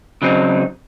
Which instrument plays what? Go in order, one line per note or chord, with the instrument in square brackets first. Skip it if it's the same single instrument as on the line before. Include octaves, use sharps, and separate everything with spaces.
[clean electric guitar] C#3 F#3 C4 D#4